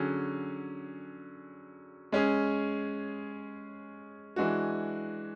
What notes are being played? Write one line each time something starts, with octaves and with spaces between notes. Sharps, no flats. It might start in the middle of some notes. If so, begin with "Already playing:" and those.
Already playing: D3 F#3 C#4 G#4
G#3 C#4 G#4
E3 G#3 D4 F#4